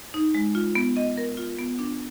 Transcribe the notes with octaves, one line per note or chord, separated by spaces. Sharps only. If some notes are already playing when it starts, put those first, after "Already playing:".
D#4
G#3
F4
B3
D#5
A#4
F4
B3
D4